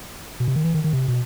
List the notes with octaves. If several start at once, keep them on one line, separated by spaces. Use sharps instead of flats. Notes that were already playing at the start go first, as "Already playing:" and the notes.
B2
C3
D#3
E3
D#3
D#3
C3
B2